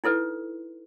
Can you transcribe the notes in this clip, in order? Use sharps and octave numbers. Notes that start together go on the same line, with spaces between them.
D#4 E4 A4 B4